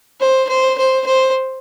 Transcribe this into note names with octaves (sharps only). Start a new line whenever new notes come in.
C5
C5
C5
C5